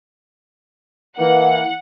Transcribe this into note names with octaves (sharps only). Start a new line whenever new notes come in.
E3 A#3 F#5